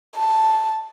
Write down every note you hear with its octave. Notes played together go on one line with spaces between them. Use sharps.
A5